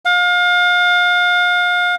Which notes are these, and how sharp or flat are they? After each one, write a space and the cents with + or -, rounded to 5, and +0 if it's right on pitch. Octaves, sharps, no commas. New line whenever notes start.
F5 +35